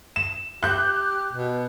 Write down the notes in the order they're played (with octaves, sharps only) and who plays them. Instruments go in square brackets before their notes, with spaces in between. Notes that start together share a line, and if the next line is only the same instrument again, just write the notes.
[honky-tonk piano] E7
[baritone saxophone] G4 [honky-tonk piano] F#6 G6
[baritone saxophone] B2